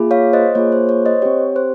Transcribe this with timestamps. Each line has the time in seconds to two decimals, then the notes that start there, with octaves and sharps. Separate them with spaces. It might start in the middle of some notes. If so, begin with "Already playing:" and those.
Already playing: A#3 F4 G#4
0.11 C#5 F5
0.33 C5 D#5
0.55 A#3 F4 G#4 C#5
0.72 C5
0.89 C#5
1.06 C5 D#5
1.22 C4 G4 C#5
1.56 C5